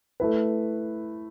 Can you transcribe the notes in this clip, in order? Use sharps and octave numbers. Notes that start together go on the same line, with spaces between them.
A3 E4 B4